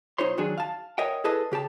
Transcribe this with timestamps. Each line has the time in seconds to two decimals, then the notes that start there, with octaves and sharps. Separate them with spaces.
0.18 B1 D#4 F4 C5 C#5 C6
0.38 D#3 F#3 D4 G#4
0.58 F5 A5
0.98 A#4 C#5 D#5 E5 F#5 G5
1.24 E4 G#4 A4 B4 D#5 A5
1.52 C#3 G4 G5 A5